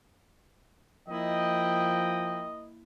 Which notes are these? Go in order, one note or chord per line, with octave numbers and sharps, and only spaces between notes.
F3 A#3 E4 D#5 G5